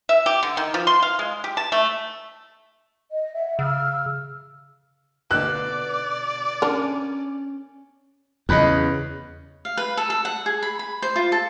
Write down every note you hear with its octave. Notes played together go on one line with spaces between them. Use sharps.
E5
G4
D3
D#3
F3
C6
F5
G#3
G4
A5
A3
D#5
E5 F#5
C#3 E6 F6
B2 D3 D5 F#6
C#4 D4 A#4
E2 C#3 D#5 B5 F#6
F5
B4
A4
A4
F#5
G#4
B5
B5
C5
F4
A4